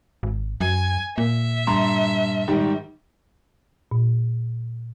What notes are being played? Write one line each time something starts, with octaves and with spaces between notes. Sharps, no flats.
G#1
F#2 G#5
A#2 E5
G2 A#5 C6
G#2 D#3 G3
A#2